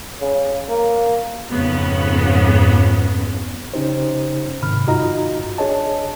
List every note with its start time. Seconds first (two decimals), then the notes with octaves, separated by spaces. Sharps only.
0.21 C#3
0.69 A#3
1.51 F2 G#2 C#3 B3
3.74 C#3 C#4 D#4 G4 C5
4.61 G#2 C3 D#3 B5 F6
4.87 G2 D#4 F4 F#4 D#5 A#5
5.58 D4 G#4 C#5 D#5 A5